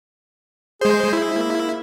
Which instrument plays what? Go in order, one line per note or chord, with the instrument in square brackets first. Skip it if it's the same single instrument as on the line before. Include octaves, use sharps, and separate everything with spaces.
[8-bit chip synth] G#3 C5 [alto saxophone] G#4
[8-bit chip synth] E4
[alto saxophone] A#3